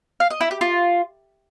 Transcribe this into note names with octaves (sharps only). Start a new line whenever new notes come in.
F5
D#5
E4
G4
F4